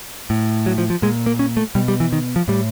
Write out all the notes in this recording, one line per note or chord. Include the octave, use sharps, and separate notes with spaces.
A2
F#3
F3
F3
A#2 G#3
A#3
C#4
A3
B2 G3
G3
E3
D#3
F3
A2 G3